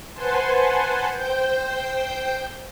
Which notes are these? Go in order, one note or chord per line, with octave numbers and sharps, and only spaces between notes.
B4 C5 F#5 G#5 A5 C6
C5 G5 G6